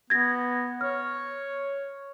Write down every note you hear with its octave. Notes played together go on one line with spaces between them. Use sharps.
B3 G#6 A#6
C#5 F6